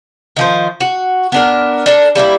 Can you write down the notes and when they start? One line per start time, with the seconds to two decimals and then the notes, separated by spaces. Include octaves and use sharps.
0.37 D#3 F3 C5
0.81 F#4
1.32 B3 D4 A#4
1.86 D4 A4 A#4
2.15 G3 A#3 D#4 E4